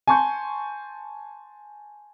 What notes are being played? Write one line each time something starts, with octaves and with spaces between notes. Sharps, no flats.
G#5 A5 C6 C#6 G6